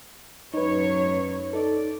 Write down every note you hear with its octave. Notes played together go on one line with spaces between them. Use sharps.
F#2 F#3 D#4 B4 C#5
D#4 A4 D5